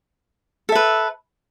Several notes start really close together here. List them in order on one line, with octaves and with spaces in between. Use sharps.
A4 E5 B4